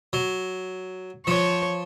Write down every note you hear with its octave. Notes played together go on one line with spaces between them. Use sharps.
F#3
F3 C#5